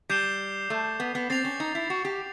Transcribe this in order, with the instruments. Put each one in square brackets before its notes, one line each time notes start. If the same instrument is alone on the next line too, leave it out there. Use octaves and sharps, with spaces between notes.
[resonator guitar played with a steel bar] G3 [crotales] D6 G6 C7 E7 G7
[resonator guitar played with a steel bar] A3
B3
B3
[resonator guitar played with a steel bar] C4 [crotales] A6 C7 F7
[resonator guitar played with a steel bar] C#4
D#4
E4
F#4
G4